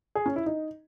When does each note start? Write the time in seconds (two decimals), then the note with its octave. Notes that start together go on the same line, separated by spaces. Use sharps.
0.15 G#4
0.26 C#4
0.36 E4
0.46 D#4